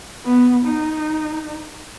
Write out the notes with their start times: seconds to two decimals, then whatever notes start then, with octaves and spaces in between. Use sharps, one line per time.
0.25 B3
0.65 D#4